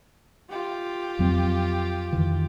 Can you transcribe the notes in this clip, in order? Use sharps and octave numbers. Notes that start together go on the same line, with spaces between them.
F4 G4
F2 F#3 C4
F2 D#3 E3